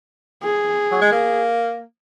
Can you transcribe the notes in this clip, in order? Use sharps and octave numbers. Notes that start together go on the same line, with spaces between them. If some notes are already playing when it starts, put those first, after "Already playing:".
G#4
F#3
G#3
A#3